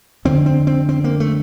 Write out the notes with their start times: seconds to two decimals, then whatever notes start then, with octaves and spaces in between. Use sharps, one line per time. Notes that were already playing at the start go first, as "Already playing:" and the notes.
0.25 F2 D3 C4
0.46 C4
0.67 C4
0.89 C4
1.04 A#3
1.20 A3